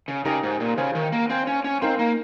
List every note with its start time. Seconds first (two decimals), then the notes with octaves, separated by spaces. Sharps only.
0.08 C#3
0.25 C#3 D#4 G4 A#4 D#5 A#5
0.43 G#2
0.60 A#2
0.78 C#3 C5 F5 G#5
0.95 D#3
1.12 A#3
1.30 C4 C5 F5 G#5
1.47 C#4
1.64 C#4
1.81 C4 D#4 A#4 F5 C6
1.99 A#3